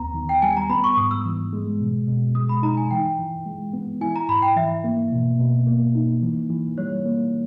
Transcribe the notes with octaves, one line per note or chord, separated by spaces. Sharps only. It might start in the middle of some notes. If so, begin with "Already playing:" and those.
Already playing: D#2 B3 A#5
D#3
G5
G3 G#5
A#5
B3 B5
C#6
G#2 D#6
E6
E3
G#3
B2
B2
G#3 D#6
B5
D#4 A#5
G#5
E3 G5
E3
G#3
B3
E4 G#5
A#5
G#2 B5
G5
E3 E5
A#3
B2
B2
A#3
D#4
E3
E3
G3 C#5
A#3